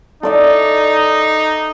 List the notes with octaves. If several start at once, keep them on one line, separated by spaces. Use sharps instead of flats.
D#4 A4 D5 E5